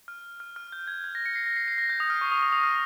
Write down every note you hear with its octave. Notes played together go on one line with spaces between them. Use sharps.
F6
F6
F6
G6
G#6
G#6
A#6
C#7
C7
A#6
C7
C7
A#6
G6
D#6
F6
C#6
D#6
D#6
D#6
F6